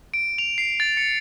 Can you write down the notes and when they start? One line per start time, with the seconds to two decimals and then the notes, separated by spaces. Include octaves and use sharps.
0.14 D7
0.38 F7
0.58 C7
0.80 A6
0.97 C#7